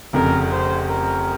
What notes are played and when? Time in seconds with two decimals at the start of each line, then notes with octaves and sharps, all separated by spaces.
0.13 F1 F2 C#3 A#4
0.52 C5
0.89 A#4